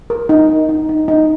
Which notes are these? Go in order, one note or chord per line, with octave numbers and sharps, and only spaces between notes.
A#4
D#4
D#4
D#4
D#4
D#4